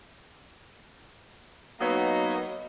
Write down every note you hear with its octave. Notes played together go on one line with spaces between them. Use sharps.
F#3 A#3 B3 D#4 C#5 D#5